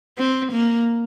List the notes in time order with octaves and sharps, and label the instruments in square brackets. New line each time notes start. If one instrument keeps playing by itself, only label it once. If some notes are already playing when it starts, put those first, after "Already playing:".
[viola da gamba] C4
A#3